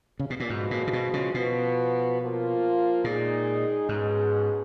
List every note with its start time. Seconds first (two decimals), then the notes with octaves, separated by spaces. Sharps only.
0.20 C#3
0.30 B2
0.40 A#2
0.50 G#2 F3 G#3 B3 F#4
0.71 A#2
0.87 C#3
0.93 B2
1.13 C#3
1.34 B2 F3 B3 F#4
2.20 F3 A#3 F4
3.04 A#2 D#3 G#3 D#4 G#4
3.89 G#2 B2 G#3 C#4 G#4